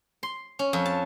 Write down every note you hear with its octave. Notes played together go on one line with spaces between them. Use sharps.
C6
C#4
F2
A5